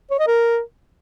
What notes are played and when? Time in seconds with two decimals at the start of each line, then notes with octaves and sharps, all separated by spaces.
0.11 C#5
0.19 D#5
0.27 A#4